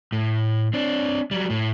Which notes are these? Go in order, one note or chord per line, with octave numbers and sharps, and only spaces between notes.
A2
C4 D4
F#3 G3
A2